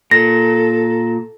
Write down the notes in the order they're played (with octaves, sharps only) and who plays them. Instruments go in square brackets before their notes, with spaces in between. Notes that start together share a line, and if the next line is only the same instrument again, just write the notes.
[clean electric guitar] A#2 [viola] A4 [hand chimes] A#6